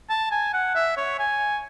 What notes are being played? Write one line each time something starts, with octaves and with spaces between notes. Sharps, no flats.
A5
G#5
F#5
E5
C#5
G#5